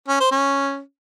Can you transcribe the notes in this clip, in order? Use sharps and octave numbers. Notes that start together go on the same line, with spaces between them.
C#4
C5
C#4